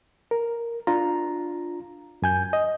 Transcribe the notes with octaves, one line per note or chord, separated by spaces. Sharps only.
A#4
D4 F4 A#5
F#2 G#5 G6
D#5